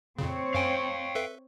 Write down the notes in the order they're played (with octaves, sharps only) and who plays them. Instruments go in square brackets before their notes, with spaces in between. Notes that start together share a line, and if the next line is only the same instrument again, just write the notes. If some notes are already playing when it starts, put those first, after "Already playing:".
[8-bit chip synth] F2 A#2 C#3 [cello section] C4 C#5
[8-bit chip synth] F#2 G#5 [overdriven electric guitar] F5 G5
[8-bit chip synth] A4 B4 E5